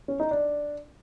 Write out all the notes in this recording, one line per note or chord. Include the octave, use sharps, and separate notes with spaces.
C#4
D#4
D4